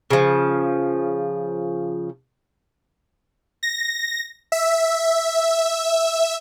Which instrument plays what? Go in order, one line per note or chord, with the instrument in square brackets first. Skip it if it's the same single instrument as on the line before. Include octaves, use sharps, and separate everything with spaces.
[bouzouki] C#3 F3
[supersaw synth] A#6
E5